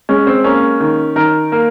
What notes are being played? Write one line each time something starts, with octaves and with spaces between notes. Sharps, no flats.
G#3 C#4
C4
A#3 C#4
D#3
D#3 A#4
A#3